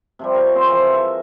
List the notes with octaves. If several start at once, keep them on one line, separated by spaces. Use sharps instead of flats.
C3 F3 G3
A#4 C#5
C4 G#4 C5 F5
E3 F3 C4
E5